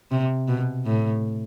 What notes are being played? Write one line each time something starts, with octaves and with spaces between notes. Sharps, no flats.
C3
B2
A2